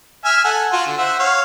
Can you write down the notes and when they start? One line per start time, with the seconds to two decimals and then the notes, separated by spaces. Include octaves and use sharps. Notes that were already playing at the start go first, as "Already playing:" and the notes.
0.25 E5 G#5 F6
0.45 A4 F#5 G#5
0.72 F4 F#4
0.86 D3
0.98 C5 E5 F#5
1.19 C#5 F5